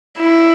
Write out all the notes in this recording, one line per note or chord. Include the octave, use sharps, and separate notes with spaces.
E4